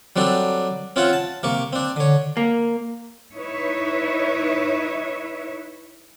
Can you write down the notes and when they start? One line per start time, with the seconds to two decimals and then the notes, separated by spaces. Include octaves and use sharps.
0.16 F#3 G3 C4 D4 A4
0.96 C4 C#4 F4 C#5 E5 F#5
1.13 A5
1.43 C3 A#3 C#6
1.73 C4 D4
1.96 D3 C#5
2.37 A#3
3.35 D#4 E4 B4 C#5 E5